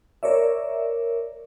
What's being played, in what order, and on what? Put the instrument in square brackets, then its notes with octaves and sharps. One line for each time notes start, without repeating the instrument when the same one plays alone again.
[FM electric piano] A#4 C#5 D5 E5